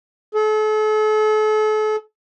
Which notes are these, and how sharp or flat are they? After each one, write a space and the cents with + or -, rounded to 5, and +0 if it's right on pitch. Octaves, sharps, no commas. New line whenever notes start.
A4 -40